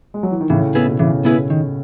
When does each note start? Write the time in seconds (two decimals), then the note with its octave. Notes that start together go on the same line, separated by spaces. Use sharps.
0.14 G#3
0.23 F#3
0.31 E3
0.41 D#3
0.50 A2 C#3 E3
0.75 B3 E4 G#4 B4
0.88 B2
0.99 A2 C#3 E3
1.25 B3 E4 G#4 B4
1.50 D#3